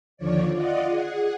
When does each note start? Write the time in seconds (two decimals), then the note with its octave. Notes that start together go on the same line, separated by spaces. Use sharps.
0.17 D#2 D3 F3 C#5 D5
0.54 F4 D5 D#5 F#5
0.89 G#4 F#5